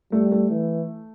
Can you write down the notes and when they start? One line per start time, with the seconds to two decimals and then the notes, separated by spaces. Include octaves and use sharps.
0.12 G3 A3
0.31 A3
0.50 E3